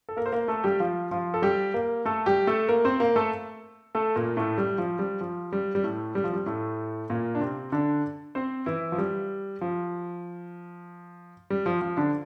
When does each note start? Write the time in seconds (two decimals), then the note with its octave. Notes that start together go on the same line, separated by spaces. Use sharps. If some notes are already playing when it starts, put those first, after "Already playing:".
0.09 A4
0.17 A#3 A#4
0.26 C5
0.32 A#3 A#4
0.48 A3 A4
0.64 G3 G4
0.80 F3 F4
1.11 F3 F4
1.34 A4
1.42 G3 G4
1.74 A#3 A#4
2.05 A3 A4
2.26 G3 G4
2.47 A3 A4
2.69 A#3 A#4
2.85 C4 C5
3.00 A#3 A#4
3.16 A3 A4
3.95 A3 A4
4.16 A#2 A#3
4.37 A2 A3
4.58 G3
4.78 F3
4.99 G3
5.21 F3
5.52 G3
5.75 G3
5.84 A2 A3
6.15 G3
6.24 F3
6.33 G3
6.46 A2 A3
7.10 A#2 A#3
7.35 D4
7.40 C3 C4
7.72 D3 D4
8.35 C4 C5
8.66 E3 E4
8.92 F3
8.98 G3
9.61 F3
11.50 G3
11.66 F3
11.82 F3
11.97 D3 D4